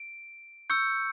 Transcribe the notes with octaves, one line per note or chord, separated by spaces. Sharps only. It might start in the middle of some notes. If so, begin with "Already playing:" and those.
Already playing: D7
C#6 E6 G6 C#7